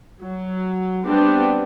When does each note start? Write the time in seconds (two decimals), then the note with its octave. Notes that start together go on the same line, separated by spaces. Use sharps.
0.21 F#3
1.06 G3 B3 C4 D4 G4